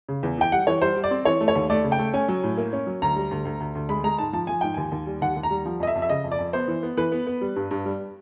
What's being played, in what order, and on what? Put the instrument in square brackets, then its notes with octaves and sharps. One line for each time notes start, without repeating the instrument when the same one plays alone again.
[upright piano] C#3
E2
E3 G5
G3 F#5
E3 C#5
G3 C5
G3
D5
C4
E3 C#5
A3
C#5
D#2
A3 D5
C#3
G5
A3
C#4 G#5
F#3
A2
A#3
C#4
F#3
D2 A#5
G3
D2
D2
D2
D2
G#3 B5
G#3 A#5
G#2 A5
F3 A5
F3 G#5
G#2 G5
D#2 G#5
D#2
G3
D#2 F#5
D#2
A#5
G3
F3
F2 D#5
E5
F2
E5
C#3 D#5
F2
D5
F2
B3 C5
E3
B3
E3 B4
B3
B3
G3
G2
G2
G3